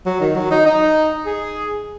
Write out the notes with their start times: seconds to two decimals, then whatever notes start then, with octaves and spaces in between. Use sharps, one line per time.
0.06 F#3
0.21 D#3
0.36 F#3
0.51 D#4
0.66 D#4
1.26 G#4